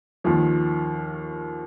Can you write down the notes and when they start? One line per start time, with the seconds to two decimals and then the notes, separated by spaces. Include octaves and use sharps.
0.24 D#2 D#3 F3 A#3 F4